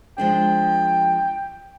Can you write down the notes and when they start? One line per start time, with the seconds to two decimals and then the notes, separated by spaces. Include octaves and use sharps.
0.18 F3 G#3 D4 G5